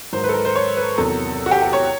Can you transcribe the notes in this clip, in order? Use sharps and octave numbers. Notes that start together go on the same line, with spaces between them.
G#2 D#3 F#3 C5
B4
A4
A#4
C5
C#5
B4
E2 C3 D#3 F#3 A4
F#4
G4
G4
C#5